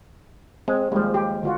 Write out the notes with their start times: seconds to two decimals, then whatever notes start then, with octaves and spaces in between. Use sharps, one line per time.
0.68 G#3 C4
0.92 D#2 F3 G3 G#3
1.14 G4
1.43 D3 F4 F#4